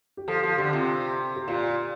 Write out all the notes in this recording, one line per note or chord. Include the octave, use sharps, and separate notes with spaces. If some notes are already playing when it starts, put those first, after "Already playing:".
G4
F3 A4
F3 G4
D3 G4
C3 F4
G4
A#2 F4